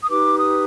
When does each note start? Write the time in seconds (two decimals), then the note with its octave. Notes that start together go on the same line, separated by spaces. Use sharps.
0.02 D#6
0.09 D#4 G4 B4 D6
0.37 D#6